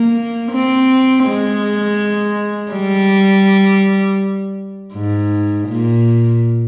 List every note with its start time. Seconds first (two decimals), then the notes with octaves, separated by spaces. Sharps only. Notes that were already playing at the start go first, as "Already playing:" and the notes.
Already playing: A#3
0.52 C4
1.26 G#3
2.72 G3
4.94 G#2
5.68 A#2